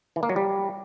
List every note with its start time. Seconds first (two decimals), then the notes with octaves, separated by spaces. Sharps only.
0.16 E3
0.23 A#3
0.29 F#3
0.36 G3